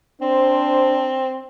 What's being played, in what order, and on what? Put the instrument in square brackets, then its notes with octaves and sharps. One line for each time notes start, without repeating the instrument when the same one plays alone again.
[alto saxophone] C4 [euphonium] D4 [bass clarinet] C5